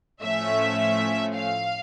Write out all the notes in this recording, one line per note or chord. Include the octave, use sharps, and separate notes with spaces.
A2 F3 A3 C#4 E5
F5